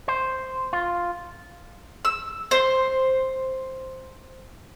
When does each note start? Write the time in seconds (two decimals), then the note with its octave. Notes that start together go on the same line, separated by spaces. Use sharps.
0.08 C5
0.73 F4
2.05 E6
2.51 C5